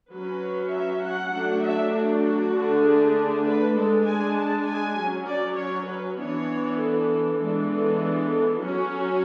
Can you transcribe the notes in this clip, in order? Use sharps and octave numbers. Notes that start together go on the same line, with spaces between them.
F#3 C#4 B4
E5
F#5
F#3 A3 D4
E5
F#4
F#4
D3 A3 D4
G#4
B4
G#3 D4 A4
G#5
A5
G#5
F#3 C#4
D5
C#5
B4
E3 B3 D4 C#5
A4
E3 G#3 B3 D4
A4
F#3 C#4 F#4